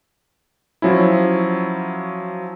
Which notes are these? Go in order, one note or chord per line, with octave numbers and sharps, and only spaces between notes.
F3 F#3 C#4 E4